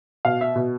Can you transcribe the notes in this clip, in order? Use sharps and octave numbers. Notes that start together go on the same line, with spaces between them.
B2 F5
E5
B2